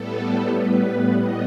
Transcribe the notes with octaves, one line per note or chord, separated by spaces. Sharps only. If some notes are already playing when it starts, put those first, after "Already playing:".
Already playing: A2 G3 B3 A4
B4
D#5